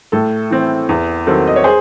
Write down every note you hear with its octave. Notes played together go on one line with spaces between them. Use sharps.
A2 A4
E3 C4
E2
D#3 F#3 C4 A4
D#5
C#5
G#4 C5